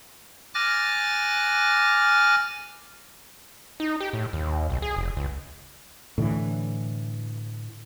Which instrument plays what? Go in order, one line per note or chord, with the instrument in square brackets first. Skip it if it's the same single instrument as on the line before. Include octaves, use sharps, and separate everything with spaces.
[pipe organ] G#5 D6 F6 F#6 A6 A#6
[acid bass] D#4
G4
A2
D#2
B1
G#4
F1
C#2
[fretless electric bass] A2 D3 E3